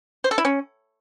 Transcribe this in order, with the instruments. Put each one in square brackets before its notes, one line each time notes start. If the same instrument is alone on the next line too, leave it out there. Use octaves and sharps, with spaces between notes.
[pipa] C5
A4
E4
C#4